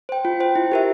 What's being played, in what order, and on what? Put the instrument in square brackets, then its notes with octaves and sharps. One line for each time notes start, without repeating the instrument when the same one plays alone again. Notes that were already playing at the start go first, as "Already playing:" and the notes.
[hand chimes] C5 G5
F4
C5 G5
E4
G4 A#4 E5